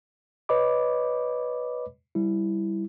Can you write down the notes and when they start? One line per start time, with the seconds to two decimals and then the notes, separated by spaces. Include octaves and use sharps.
0.49 B4 C#5 D#5 B5 D6
2.15 G3 E4